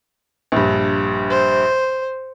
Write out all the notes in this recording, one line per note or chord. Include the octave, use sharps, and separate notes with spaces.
A#1 G2
C5